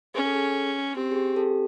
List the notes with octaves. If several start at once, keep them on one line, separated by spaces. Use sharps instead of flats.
C#4 G#4
A4
G#4
C4 G4
G#4
G4
G4 A4